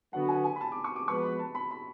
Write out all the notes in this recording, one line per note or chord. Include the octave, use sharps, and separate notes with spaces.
D3 F#3 B3 F#4 F#5
G#5
G#5
B5
A5
D6
C#6
D6
F3 G#3 B3 F#4 B4 C#6
B5
A5
B5
B5